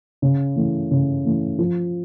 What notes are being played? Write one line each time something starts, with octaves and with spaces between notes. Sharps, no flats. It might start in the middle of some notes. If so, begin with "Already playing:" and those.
C#3
E3 A3
C#3
E3 A3
F3